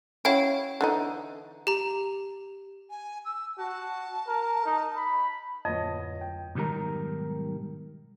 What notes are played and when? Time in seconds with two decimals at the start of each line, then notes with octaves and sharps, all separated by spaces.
0.25 C#4 E4 F#4 C#5 F5 G5
0.81 D3 E3 D#4
1.67 G4 A#5
2.90 G#5
3.25 E6
3.58 F#4 A5
4.28 A#4
4.65 D#4
4.97 B5
5.65 D1 F2 C#5 D#5
6.21 G5
6.55 B1 G#2 D#3 G3 A#4 A#5